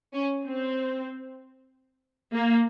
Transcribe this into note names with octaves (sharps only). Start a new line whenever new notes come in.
C#4
C4
A#3